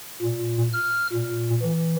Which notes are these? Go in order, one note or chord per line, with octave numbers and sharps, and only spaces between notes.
A#2
F6
A#2
E3